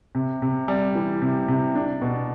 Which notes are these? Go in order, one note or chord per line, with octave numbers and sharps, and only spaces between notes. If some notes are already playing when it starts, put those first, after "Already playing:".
C3
C3
G3
E3
C3
C3
D4
B2